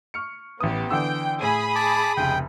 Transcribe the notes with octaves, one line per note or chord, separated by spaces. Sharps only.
C#6 F6 C#7
A1 B3 G4 D#6
D3 E3 G5 E6
A2 G#4 B5 D#6 D#7
A5 D6
F1 C#2 G5